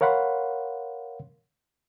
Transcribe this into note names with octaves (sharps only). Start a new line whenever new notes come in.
A#4 C#5 F5 F#5 B5 C6